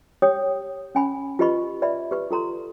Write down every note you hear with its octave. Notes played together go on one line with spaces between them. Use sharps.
G4 C#5 G5 D#6
C#4 G#5 B5
F4 G4 B4 D#5 B5 C#6
B4 D5 E5 B5
G4 B4 C#6
F4 A4 A#5 C6